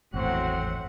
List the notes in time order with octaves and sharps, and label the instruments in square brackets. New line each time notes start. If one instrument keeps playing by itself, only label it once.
[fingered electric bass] G#1 E2 [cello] A2 F#5 [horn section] F#3 C4 F#4